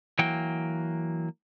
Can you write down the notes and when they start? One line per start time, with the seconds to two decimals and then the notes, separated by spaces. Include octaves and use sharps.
0.19 E3 F#3 A#3 G5